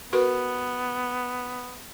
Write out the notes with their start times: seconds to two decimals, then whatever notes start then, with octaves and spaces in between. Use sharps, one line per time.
0.13 B3 F#4 A#4 B4